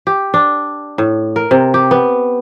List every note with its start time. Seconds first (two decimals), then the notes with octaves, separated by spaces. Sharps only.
0.07 G4
0.34 D4
0.98 A2
1.36 A#4
1.51 C3
1.74 G4
1.91 B3